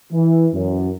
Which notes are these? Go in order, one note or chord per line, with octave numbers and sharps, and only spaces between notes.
E3
F#2